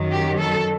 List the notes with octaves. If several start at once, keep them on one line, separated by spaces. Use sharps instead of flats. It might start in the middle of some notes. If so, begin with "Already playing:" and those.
Already playing: F#2 D#3 F#3
G4
A4